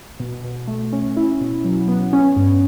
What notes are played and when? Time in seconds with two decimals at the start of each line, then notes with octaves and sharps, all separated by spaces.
0.20 B2
0.44 B2
0.68 A3
0.93 C#4
1.17 E4
1.41 B2
1.65 F#3
1.88 B3
2.13 C#4
2.36 G2